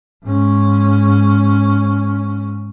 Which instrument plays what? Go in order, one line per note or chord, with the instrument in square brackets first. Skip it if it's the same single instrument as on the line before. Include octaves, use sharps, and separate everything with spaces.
[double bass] G#2 C#4